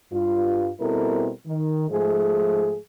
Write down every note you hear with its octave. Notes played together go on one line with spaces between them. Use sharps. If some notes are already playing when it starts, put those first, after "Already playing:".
G2 F4
B2 G3 C4 E4 A4 A#4
D#3
G#2 F3 A3 G#4